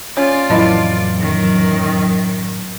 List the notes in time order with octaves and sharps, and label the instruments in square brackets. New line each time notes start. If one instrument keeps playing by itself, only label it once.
[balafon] C#4 C#5 [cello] F4 D5
[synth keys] F2 E3 F#3 [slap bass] A2 [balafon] E4 D#5 A5
[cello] F#2 D#3